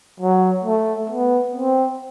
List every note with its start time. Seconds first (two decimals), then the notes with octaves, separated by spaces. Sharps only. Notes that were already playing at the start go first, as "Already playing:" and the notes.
0.20 F#3
0.64 A3
1.10 B3
1.55 C4